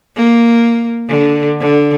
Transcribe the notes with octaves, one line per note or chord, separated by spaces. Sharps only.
A#3
D3
D3